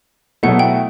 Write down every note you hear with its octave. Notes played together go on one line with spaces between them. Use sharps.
B2 F#3 A3 E4 F#5
G5